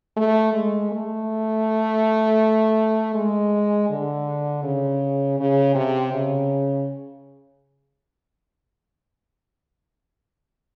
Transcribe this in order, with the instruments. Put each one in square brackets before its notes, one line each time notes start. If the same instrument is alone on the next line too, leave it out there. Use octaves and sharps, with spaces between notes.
[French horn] A3
G#3
A3
G#3
D3
C#3
C#3
C3
C#3